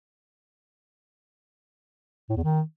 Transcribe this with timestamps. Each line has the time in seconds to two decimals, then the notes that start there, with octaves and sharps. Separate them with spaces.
2.30 A2
2.37 E2
2.44 D#3